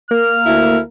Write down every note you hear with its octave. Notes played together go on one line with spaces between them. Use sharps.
A#3 F6
D2 E4